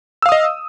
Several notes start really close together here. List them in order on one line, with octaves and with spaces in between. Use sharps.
E6 F5 D#6 D#5